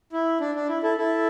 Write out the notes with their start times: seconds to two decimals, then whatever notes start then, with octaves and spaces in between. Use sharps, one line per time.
0.13 E4
0.41 D4
0.55 D4
0.68 E4
0.82 E4 A4
0.97 E4 A4